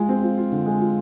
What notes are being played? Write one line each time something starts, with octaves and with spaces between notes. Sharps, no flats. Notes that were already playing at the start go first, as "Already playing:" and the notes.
Already playing: G#3 F4
C4
F4
F4
D3
G#3
F4